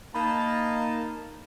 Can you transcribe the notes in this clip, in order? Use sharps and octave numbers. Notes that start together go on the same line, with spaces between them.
A#3 D#4 A5 B5